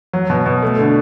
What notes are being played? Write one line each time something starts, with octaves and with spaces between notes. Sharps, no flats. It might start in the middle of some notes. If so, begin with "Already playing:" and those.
F#3
B2
B2
A3
D3